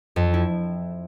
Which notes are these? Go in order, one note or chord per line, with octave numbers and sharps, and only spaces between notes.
F2
E4